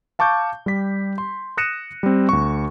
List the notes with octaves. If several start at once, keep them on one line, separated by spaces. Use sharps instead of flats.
F5 A5 C#6 D6 G6
G3 G4 B6
C6
D#6 F#6 A#6 C#7 D#7 E7
G3 C4
D2 C#6